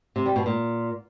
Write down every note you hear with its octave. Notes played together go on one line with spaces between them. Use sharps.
C3
G3
B2
A#2